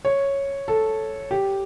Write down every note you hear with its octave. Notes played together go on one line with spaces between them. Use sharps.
C#5
A4
G4